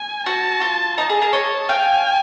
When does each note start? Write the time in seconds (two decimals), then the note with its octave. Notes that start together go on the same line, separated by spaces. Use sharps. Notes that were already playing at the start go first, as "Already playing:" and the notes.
Already playing: G#5
0.26 F#4 A5
0.61 F4
0.98 D#4 A5
1.10 G#4
1.21 G#4 A#4
1.33 C#5 D#5
1.69 F5 G5 G#5